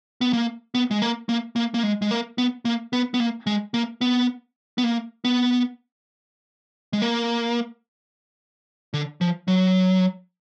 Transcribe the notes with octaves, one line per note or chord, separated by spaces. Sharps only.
B3
A#3
B3
G#3
A#3
A#3
A#3
A#3
G#3
G#3
A#3
B3
A#3
B3
B3
A#3
G#3
A#3
B3
B3
A#3
B3
G#3
A#3
D3
F3
F#3